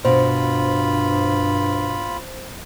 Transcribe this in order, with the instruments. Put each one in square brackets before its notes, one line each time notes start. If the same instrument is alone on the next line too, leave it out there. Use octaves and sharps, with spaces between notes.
[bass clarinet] G2 [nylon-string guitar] B2 [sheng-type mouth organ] F4 B5 [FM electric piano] C5